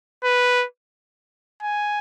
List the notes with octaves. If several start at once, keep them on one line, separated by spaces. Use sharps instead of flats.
B4
G#5